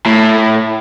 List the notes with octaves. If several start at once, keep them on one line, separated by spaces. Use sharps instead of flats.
A2